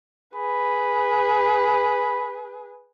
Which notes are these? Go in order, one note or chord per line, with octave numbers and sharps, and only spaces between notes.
G#4 B4 B5